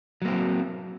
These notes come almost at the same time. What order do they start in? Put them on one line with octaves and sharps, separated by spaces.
F#3 A#3 C4